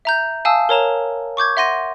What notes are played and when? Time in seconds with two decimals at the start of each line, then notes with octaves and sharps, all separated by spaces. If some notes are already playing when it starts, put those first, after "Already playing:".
0.05 E5 A#5 G6
0.45 F5 G#5 A5 D#6 E6
0.69 A#4 C#5 A#5 E7
1.37 C#6 D6 G6 G#6
1.57 E5 F#5 C6 A#6 D#7